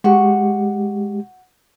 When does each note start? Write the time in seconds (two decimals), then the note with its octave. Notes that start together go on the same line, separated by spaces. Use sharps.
0.04 G#3 F#4 G4 C#6